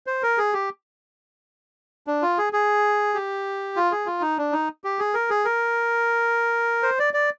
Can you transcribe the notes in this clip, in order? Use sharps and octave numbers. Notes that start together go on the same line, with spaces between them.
C5
A#4
G#4
G4
D4
F4
G#4
G#4
G4
F4
G#4
F4
D#4
D4
D#4
G4
G#4
A#4
G#4
A#4
C5
D5
D5